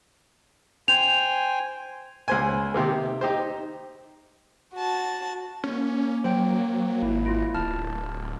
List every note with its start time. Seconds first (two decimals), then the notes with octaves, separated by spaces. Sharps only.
0.88 C5 G5 G#5 F7
2.28 C#2 C5 G#5
2.74 C3 D#3 A#3
3.21 D#4 G4 C5
4.74 F#4 A5
5.64 A#3 C#4
6.24 F#3 C5 G5
7.03 G#1 E4
7.26 E4 F4
7.54 D1 A5 F6